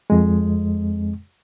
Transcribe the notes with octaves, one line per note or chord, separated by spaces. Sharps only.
F2 G#3